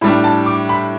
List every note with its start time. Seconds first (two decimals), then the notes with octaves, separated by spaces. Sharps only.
0.01 A2 G3 D4 B5
0.24 A5
0.46 D6
0.69 B5